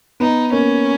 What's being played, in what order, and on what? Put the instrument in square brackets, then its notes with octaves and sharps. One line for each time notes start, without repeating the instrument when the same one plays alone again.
[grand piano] B3 [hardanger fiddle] D#4
[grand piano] A#3 [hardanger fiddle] C#4